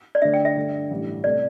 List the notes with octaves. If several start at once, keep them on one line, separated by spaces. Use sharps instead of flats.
D5
D2 D3 A3 D4 E5
G5
E5
G2 D3 A3
A1 G2 E3 G3
C3 A3 D5